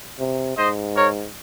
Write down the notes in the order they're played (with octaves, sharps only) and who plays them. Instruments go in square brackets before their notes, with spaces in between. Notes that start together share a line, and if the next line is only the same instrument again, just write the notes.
[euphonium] C3
[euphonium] G#2 [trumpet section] C5 D#5
[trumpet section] A#4 C#5